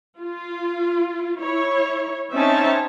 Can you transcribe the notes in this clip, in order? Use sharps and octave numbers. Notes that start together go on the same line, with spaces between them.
F4
E4 C#5
C4 C#4 D#4 C#5 E5 A5